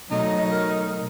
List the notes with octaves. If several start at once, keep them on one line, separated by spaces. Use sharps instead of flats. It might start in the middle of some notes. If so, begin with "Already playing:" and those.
B2 F#3 A3 D#4 D#5
A#4